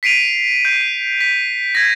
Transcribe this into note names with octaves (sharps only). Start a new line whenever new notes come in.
B6 C7 D7 D#7 F7
G6
B6
G#6 A#6